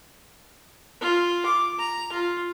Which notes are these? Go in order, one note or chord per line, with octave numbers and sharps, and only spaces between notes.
F4
D6
A#5
F4